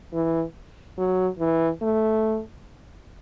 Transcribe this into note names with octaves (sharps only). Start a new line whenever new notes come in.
E3
F#3
E3
A3